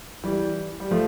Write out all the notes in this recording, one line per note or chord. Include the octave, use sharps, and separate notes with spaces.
E3 G3
G3
F3 A3